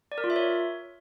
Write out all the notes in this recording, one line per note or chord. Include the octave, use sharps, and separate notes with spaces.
D5
A#4
F4
E5
C#5